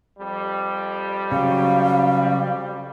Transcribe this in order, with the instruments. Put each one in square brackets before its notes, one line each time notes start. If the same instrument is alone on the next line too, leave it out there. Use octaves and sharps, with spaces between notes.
[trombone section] F2 G3
[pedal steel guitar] C#3 F#3 [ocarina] F5